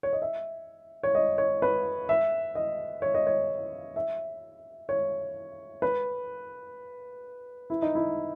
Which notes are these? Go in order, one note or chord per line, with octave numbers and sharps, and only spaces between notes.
C#5
D#5
E5
C#5
D#5
C#5
B4
E5
D#5
C#5
D#5
C#5
E5
C#5
B4
E4
D#4
E4